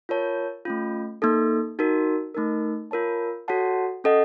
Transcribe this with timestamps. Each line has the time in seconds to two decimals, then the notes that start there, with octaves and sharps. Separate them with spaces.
0.09 F4 A#4 C#5 A5
0.65 A3 C#4 F4
1.22 A#3 D#4 A4
1.79 D#4 F#4 A#4
2.35 A3 D#4 A#4
2.91 F4 A#4 C#5 A5
3.48 F#4 A4 C#5 F#5 A5
4.04 C#4 A4 D#5 F#5